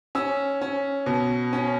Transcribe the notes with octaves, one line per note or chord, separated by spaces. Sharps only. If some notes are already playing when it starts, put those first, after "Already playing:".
C#4 E6
C#4
B2
C#4